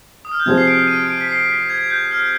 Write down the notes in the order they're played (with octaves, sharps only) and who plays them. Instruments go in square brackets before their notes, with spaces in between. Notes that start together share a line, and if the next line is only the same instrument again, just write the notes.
[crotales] D#6
F6
G6
[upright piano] C3 F3 C4 F4 G#4 [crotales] G#6
[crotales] C7
D7
D#7
D7
B6
C7
B6
G#6
G6
F6